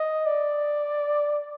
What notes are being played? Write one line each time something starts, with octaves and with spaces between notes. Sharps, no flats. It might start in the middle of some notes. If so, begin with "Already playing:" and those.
Already playing: D#5
D5